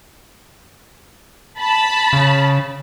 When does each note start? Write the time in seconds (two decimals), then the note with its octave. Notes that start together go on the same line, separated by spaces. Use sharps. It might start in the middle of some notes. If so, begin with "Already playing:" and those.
1.59 A5 B5
2.13 C#3